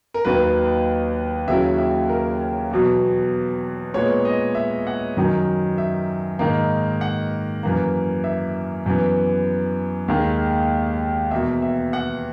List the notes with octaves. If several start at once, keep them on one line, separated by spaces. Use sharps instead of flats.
A#4
D#2 D#3 F#3 B4
D#2 C#3 F#3 C#4 E4 E5
E5
A#4
E2 B2 F#3
A#2 G#3 B3 C#5
D#5
E5
F#5
F#2 D#3 F#3
E5
G#2 D#3 A#3
F#5
F#2 E3 A#3
E5
F#2 E3 B3
D#2 D#3 G#3
E2 B2 A#3 E5
E5
F#5